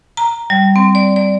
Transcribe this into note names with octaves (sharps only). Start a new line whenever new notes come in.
A#5
G3
C4
D5
D5